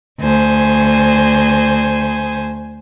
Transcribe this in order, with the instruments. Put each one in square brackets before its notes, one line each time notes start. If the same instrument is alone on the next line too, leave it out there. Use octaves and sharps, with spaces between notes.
[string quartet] D2 C5 G#5